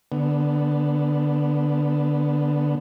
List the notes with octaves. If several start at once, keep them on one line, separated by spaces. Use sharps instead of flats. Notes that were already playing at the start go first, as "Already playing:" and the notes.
D3 B3